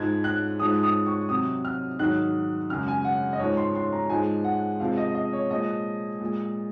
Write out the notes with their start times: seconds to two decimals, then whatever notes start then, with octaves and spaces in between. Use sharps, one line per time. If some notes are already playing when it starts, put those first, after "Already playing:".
Already playing: G#2 F3 G#3 G#6
0.24 F#6
0.59 G#2 F3 G#3 D#6
0.83 D#6
1.06 C#6
1.29 C3 F#3 D#6
1.65 F6
1.99 G#2 D#3 F#3 F#6
2.70 F#2 C#3 G#3 F6
2.88 G#5
3.05 F#5
3.33 D#5
3.39 G#2 F3 G#3 C#5
3.57 C6
3.75 C6
3.93 A#5
4.09 G#2 F3 G#3 G#5
4.44 F#5
4.80 C3 F3 G#3 F5
4.97 D#5
5.15 D#5
5.33 C#5
5.51 A#2 F3 G#3 D#5
6.20 A#2 G#3